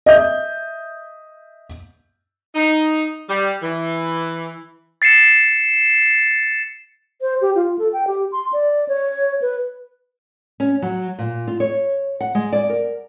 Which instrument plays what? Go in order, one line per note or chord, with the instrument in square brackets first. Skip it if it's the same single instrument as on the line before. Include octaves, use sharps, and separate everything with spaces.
[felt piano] D#5 E5 G6
[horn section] D#4
G3
E3
[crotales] A6 C7 C#7 E7
[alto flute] C5
G4
F4
A4
G5
G4
C6
D5
C#5
B4
[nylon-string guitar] C#4
F#3
A#2
F4
C#5
F#5
G#3
D5
A#4